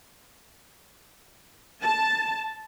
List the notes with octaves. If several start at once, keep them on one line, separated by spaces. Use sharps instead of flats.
A5